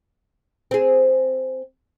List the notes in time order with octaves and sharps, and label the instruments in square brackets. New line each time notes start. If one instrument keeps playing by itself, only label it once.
[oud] C4 G#4